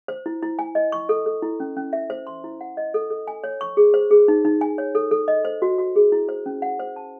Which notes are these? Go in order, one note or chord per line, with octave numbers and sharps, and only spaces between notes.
C5
E4
E4
G#5
D#5
C#6
A4
A4
E4
C#4
C#4
E5
C5
C6
E4
F#5
D#5
A4
A4
G#5
C#5
C#6
G#4
C5
G#4
D#4
D#4
G#5
C#5
A4
A4
D#5
C5
F#4
F#4
G#4
E4
C5
C#4
F#5
C5
A5